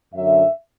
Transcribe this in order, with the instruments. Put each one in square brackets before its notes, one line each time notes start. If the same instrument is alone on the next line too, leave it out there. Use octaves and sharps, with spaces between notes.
[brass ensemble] F#2 D3 F#3 E5